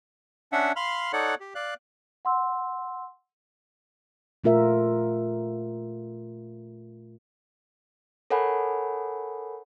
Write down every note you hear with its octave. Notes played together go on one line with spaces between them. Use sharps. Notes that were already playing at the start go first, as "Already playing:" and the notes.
C#4 D4 E5 F#5
F5 B5 C6 F6
D#4 A4 C#5 D5 F#5 F#6
G4
D5 F5 F#6
F#5 C6 E6
A#2 A3 F4 A#4 E5
A4 A#4 C#5 F#5 G#5 B5